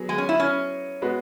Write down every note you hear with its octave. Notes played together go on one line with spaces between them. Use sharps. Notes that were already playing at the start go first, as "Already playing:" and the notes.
Already playing: F#3 B3 G#4
G#3
C#4
E4
C#4
G#3 B3 F#4 B4